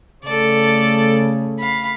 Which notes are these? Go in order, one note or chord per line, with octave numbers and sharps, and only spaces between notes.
C#3 A3 A4 D5
F5 B5